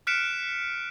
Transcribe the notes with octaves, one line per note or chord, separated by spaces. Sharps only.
F6 F#6 B6 C#7 D7 E7